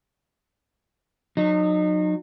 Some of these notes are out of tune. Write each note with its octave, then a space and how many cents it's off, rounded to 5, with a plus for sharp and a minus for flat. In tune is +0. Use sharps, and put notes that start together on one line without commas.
F#3 -30 D#4 -30